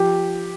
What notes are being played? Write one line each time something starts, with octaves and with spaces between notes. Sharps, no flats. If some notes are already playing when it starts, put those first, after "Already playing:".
Already playing: F3 G4